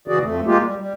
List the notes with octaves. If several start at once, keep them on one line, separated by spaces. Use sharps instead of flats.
C#3 E3 F#4 G#4 D5
F2 A3
G#3 A#3 F4 G4
G3
G3